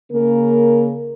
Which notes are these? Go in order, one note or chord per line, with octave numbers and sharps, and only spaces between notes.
C#3 A#3 A#4